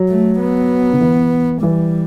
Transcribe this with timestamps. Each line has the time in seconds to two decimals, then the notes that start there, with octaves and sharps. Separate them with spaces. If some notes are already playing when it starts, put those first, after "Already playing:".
Already playing: F#3
0.09 A3
0.39 B3
0.93 D3
1.01 E3
1.62 E3 G3